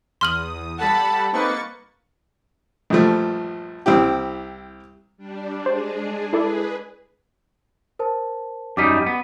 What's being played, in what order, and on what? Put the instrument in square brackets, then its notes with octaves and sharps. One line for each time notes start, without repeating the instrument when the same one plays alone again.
[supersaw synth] E2 D#6 [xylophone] C6 F6 F#7
[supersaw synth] G3 A4 F#5 [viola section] A5 B5
[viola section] A#3 [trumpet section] C4 D#4 B4 [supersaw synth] C#6 A6 C#7
[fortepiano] A#1 G2 F3 A3
C2 C4 E4 G4
[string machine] G3 D4
[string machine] G#3 D4 G#4 [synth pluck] C5
[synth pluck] E4 A4 D5 [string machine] G#4 B4
[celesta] A#4 C5 A5
[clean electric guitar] F#2 G3 D#4 [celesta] D6 B6
[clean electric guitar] B3